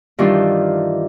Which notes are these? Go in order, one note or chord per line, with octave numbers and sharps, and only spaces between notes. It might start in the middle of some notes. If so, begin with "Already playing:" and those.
G2 D#3 E3 G3 D4 F4